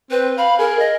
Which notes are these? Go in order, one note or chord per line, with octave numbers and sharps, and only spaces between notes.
C4 B4
F5 B5
G#4 A#4
D#5